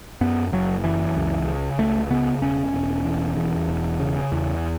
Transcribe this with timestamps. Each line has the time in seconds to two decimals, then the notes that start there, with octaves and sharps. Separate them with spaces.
0.21 F#2 B3
0.52 F#1 F#3
0.84 F#2 E3
1.16 C#2
1.47 C#3
1.79 C#2 A3
2.11 C#3 B3
2.42 E1 C#4
2.74 E1
3.05 E2
3.37 E2
3.68 E1
4.00 C#3
4.32 E2